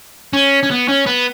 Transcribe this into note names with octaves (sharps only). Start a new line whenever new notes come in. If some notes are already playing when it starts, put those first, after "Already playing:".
C#4
C#4
B3
C#4
B3